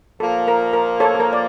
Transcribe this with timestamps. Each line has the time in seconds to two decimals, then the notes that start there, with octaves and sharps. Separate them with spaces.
0.20 A#2 F3 A#3 A4
0.48 A#4
0.73 A#4
1.00 A4 C#5
1.15 A4
1.20 A#4
1.33 D5